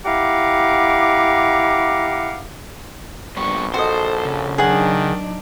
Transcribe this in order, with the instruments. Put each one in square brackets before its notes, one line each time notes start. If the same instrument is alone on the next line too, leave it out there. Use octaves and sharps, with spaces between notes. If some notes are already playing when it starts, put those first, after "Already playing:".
[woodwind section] E4 G4 F5 F#5 A#5 D6
[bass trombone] A#1 [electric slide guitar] G3 B3 D4 [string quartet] C#6
[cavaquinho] F#4 D#5 [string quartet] A4 [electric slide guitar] C5
[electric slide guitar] C#3
[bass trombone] D#3 [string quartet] F#3 D4 D#4 [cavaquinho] G#4 F#5